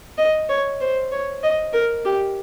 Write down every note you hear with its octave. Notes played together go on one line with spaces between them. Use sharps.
D#5
C#5
C5
C#5
D#5
A#4
G4